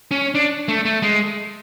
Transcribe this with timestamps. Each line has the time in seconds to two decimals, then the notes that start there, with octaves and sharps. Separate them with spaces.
0.11 C#4
0.35 D4
0.68 A3
0.85 A3
1.02 G#3